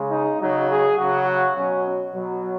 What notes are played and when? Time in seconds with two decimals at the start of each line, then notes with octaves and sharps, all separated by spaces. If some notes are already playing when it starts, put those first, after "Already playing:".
Already playing: C#3 G#3
0.11 D#4
0.40 C#3 F#3 D#4
0.69 G#4
0.98 C#3 F#3 F#4
1.27 F#4
1.56 B2 F#3 C#4
2.13 B2 F#3